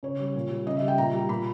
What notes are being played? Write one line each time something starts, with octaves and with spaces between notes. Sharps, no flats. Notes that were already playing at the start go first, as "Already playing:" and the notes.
C#3 C#5
G3
A#2
G3
C#3 D#5
E5
G3
G5
A#2 A#5
G3
A#2 B5